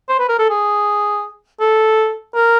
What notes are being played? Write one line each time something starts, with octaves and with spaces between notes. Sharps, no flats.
C5
B4
A#4
A4
G#4
A4
A#4